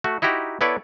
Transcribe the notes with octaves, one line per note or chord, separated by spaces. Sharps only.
A3 F#4
D#4 E4 F#4 G4 A#5
B3 E4 A4 B4 C#5 D5